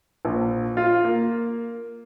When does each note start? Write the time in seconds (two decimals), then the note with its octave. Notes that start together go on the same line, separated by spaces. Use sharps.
0.25 A#1
0.77 F4
1.04 A#3